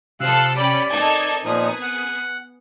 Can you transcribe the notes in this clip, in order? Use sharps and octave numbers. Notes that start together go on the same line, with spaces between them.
C3 F3 A4 F5 E6 F#6
C#4 G4 D5 B5
C4 D#4 A4 A#4 G#5 G#6
A#2 F3 B3 D#4 G#4
F#5